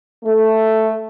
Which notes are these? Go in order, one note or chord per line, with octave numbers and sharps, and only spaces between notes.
A3